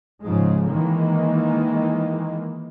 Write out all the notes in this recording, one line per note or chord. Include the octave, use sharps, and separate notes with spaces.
G#2 C#3 F3 G#3
D#3 E3 G#3 A#3